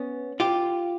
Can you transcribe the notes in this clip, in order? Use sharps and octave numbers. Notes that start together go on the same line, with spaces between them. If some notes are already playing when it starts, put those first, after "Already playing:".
Already playing: B3 C#4
F4 G4